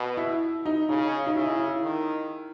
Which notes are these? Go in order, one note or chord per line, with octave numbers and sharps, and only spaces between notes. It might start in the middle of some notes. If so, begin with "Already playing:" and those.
Already playing: B2
E4
D#4
C#3 D#4
D#4
C#3 E4
E4
D#3